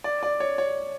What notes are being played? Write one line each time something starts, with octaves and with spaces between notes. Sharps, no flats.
D5
D5
C#5
C#5